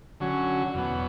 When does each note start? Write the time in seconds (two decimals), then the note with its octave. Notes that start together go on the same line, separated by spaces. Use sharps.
0.20 D3 F#3 C#4 F#4
0.74 E2 B2 F#3 B3